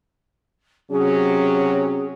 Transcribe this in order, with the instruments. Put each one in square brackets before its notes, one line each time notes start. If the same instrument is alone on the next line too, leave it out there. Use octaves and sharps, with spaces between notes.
[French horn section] C3 F#3 C#4 [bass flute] G#4